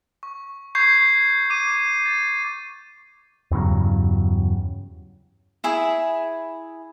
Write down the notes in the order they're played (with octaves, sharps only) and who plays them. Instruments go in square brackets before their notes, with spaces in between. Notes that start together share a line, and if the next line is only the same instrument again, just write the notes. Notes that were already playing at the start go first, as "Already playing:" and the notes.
[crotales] C#6
C#6 G6 G#6 C7
D6 D#7
A6
[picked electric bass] E2 G2 C#3 F#3
[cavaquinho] E4 G#4 E5